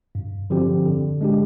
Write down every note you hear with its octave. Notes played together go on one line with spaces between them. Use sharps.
G2
D3 F3 C4 G4
D3
G#3 D4 G4